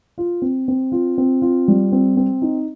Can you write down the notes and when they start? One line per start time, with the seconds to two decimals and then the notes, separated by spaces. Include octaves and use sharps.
0.18 F4
0.42 C4
0.68 C4
0.92 F4
1.18 C4
1.42 F4
1.68 G3
1.92 C4
2.17 C4
2.42 D#4